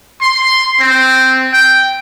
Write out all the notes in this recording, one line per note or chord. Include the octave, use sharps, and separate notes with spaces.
C6
C4
G5